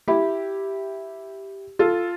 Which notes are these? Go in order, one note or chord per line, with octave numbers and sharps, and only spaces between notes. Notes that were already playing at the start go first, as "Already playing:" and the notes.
E4 G4
F4 A4